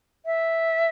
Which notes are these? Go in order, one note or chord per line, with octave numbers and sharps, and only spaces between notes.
E5